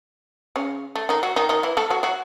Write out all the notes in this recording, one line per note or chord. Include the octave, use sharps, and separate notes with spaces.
C#3 C#4
A3
D#3 D#4
F#3 F#4
D#3 D#4
D#3 D#4
E3 E4
A3 A4
F#3 F#4
F#3 F#4